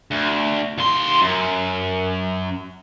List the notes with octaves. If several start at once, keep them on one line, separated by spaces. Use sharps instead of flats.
D2
D#2 C6
F#2